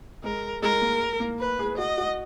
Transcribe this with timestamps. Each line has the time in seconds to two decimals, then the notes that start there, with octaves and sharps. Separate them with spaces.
0.24 G#3 A#4
0.62 G#3 A#4
0.81 A#3
1.20 A#3
1.39 B4
1.59 G#4
1.78 F#4 D#5
1.98 F#4